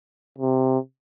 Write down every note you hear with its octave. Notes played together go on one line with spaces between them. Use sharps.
C3